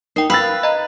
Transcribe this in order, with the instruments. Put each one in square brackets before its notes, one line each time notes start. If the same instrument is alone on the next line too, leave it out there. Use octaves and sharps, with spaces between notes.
[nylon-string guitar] D#4 [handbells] A#4 G5
[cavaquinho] B4 [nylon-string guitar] F5 [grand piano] B5 E6 A6
[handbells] D#5 A#5